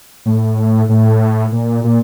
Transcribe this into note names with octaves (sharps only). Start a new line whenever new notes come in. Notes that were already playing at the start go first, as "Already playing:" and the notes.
A2
A2
A#2
A#2